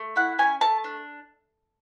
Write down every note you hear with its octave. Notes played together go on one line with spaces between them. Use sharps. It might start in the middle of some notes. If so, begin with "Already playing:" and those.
Already playing: A3
E4 F#5
C#4 G#5
A3 A5
D4